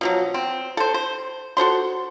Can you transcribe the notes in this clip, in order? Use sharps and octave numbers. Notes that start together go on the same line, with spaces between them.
B2 F3 F#3
C4
A4 C5
C5
F#4 A4 C5 C6